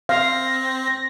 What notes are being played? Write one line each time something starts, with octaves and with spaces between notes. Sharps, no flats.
C4 F5 A#6